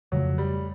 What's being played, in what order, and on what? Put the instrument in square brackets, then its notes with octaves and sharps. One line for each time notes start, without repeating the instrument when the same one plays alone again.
[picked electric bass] F2 C#3 F3 A3 [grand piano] F#3
[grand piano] G3